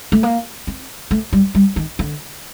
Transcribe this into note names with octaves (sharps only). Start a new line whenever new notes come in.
A3
A#3
C4
A3
G3
G3
D#3
D3